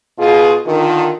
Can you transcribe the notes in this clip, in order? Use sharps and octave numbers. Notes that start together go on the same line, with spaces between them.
B2 F4 G#4
D3 D#3 F4